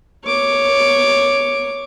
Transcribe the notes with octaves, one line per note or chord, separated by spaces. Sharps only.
C#5 D6